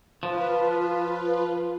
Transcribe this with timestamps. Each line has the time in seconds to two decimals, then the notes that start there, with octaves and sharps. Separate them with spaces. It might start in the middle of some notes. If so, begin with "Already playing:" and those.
0.23 F3 F4 B4